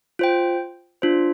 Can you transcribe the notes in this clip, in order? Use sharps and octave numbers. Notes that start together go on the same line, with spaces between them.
F4 C5 G5
D4 F4 C5